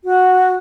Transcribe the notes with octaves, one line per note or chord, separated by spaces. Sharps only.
F#4